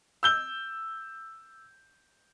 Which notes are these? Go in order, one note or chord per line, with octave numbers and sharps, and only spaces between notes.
E6 G6 G7